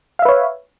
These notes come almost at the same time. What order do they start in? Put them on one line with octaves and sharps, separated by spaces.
F5 E5 B4 C#5